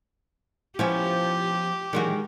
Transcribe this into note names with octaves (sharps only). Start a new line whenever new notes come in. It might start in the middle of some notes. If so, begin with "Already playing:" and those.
F3 B3 C#4 E4 G4 C5 C#5
A#2 D#3 E3 F#3 G#3 F#4